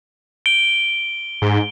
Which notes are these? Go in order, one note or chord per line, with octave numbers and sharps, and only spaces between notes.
D7 G7
G#2